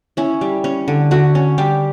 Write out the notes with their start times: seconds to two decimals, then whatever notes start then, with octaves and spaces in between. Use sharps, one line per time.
0.17 C#4 E4
0.41 G3
0.64 C#4
0.88 D3
1.11 D3 F#4
1.35 C#4
1.58 G3 G4